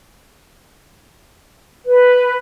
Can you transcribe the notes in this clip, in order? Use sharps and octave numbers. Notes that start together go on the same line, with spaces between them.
B4